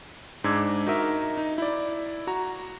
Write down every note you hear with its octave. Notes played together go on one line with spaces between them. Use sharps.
G#2 D4 D6 E6 G#6
D#4 F#4 A#4 D#5 E5
D#4
E4 D5
F#4 A#5